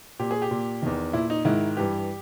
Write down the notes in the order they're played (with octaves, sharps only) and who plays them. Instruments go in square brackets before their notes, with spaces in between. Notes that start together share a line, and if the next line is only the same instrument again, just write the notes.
[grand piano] A#2 G4
G#4
G4
A#2
E2 D#3
A#2 E4
D#4
G#2 D#3 E4
G2 E3 G4